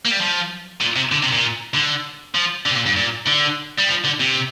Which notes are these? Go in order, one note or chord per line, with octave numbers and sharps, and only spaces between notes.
A#3
G3
F3
A#2
C3
D3
C3
A#2
D3
F3
D3
C3
A#2
G2
A#2
D3
G3
F3
D3
C3